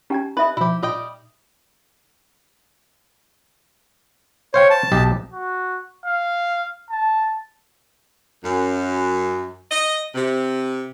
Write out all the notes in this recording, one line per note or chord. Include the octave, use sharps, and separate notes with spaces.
C#4 D#4 G4 G5 A#5 G#6
D#4 B4 D#5 E5
B2 F3 E4 G4
A#2 G3 D#5 G5
C5 C#5 F5 G5
A5
B1 G4 D#5
F#4
F5
A5
F#2
D#5
C3